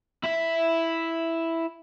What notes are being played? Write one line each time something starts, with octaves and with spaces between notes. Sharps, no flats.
E4 E5